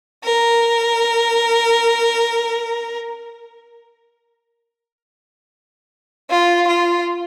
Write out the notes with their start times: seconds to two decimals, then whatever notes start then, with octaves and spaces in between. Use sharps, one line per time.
0.24 A#4
6.30 F4
6.68 F4